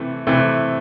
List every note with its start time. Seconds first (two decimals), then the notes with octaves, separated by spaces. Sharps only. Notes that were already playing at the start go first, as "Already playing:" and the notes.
Already playing: C3 E3 A3
0.27 C3 E3 A3